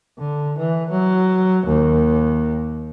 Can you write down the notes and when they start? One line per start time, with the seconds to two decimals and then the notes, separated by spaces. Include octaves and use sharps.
0.18 D3
0.58 E3
0.91 F#3
1.67 D#2